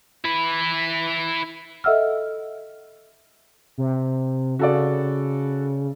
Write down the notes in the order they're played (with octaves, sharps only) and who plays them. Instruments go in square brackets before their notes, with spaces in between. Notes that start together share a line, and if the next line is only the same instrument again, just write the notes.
[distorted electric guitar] E4 B4
[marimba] A4 D#5 E5 F#5 E6 F6
[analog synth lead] C3
[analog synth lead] C#3 [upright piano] F#4 A4 D5